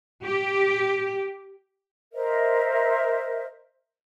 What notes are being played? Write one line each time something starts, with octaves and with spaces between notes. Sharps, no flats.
G4
A#4 C5 D#5 E5